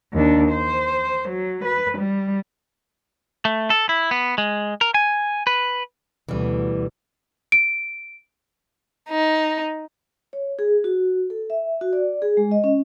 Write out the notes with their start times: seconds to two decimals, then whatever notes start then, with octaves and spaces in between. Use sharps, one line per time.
0.14 D#2 D4
0.52 C5
1.29 F#3
1.65 B4
1.99 G3
3.45 A3
3.70 A4
3.89 E4
4.11 B3
4.38 G#3
4.81 A#4
4.94 G#5
5.47 B4
6.29 D2 B2 E3 G3
7.52 D7
9.09 D#4
10.33 C#5
10.59 G#4
10.84 F#4
11.30 A4
11.50 E5
11.81 F#4
11.93 D5
12.22 G#4
12.37 G#3
12.51 D#5
12.64 C#4